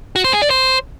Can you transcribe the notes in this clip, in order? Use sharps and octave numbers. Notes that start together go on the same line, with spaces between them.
F#4
C5
G#4
D5
C5